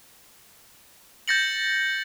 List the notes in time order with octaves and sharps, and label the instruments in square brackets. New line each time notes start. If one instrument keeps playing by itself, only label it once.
[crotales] G6 A6 A#6 C#7 F#7